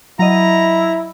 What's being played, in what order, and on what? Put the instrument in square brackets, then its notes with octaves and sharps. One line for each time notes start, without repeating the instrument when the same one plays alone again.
[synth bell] F#3 D#5 [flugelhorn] E4 [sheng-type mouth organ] A#5